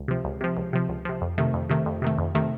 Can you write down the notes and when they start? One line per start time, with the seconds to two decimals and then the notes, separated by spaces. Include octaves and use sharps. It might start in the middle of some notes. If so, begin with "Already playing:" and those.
Already playing: C#2
0.08 C3 F3
0.24 C#2
0.41 C3 F3
0.57 C#2
0.73 C3 F3
0.88 C#2
1.05 C3 F3
1.21 F2
1.38 C3 D#3 A3
1.54 F2
1.70 C3 D#3 A3
1.86 F2
2.02 C3 D#3 A3
2.18 F2
2.35 C3 D#3 A3